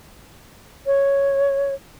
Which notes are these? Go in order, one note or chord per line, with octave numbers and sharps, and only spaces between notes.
C#5